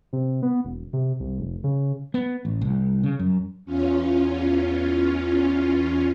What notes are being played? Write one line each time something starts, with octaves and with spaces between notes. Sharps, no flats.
C3
B3
E1
C3
C2
F1
C#3
B3
A1
C2
C#3
F#2
E2 C#4 F4